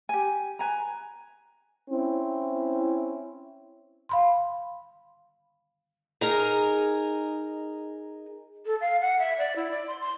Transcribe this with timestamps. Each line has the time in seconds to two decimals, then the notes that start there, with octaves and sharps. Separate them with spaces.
0.09 G4 G#5
0.59 B4 G#5 A#5
1.90 C4 C#4 E4
4.09 F5 B5 C6
6.21 D#4 G#4 A#4
8.66 A4
8.81 F5
9.01 F#5
9.19 E5
9.38 D5
9.56 E4
9.71 D5
9.88 C6
10.01 C6